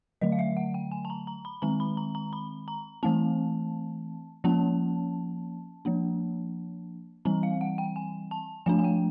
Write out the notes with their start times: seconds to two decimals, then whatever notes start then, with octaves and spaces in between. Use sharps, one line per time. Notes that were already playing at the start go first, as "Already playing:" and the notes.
0.21 D3 F#3 A3 D#5
0.32 F5
0.39 E5
0.57 F#5
0.74 G5
0.92 G#5
1.05 A5
1.10 A#5
1.27 A#5
1.45 B5
1.62 D#3 G#3 C4 A#5
1.80 B5
1.97 A#5
2.15 A#5
2.33 B5
2.68 A#5
3.03 E3 A3 C4 A5
4.44 F3 A#3 C#4 A5
5.85 F3 A#3 D4
7.25 E3 G3 C4 A#5
7.43 F5
7.61 F#5
7.78 G5
7.96 G#5
8.31 A5
8.66 F3 A3 D4 G#5
8.79 G#5
8.84 G5